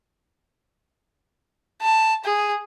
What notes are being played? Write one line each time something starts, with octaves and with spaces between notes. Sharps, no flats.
A5
G#4